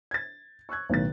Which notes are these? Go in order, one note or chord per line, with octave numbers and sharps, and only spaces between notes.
G#6 A6
C#6 E6 F#6 G#6
B1 A2 D#3 A6